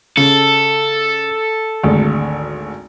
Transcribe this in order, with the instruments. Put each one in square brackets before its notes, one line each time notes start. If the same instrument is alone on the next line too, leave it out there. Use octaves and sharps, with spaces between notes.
[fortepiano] C#3 [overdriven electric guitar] A4
[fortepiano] G#1 D2